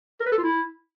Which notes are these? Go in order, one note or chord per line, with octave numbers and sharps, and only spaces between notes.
A#4
B4
A4
F4
E4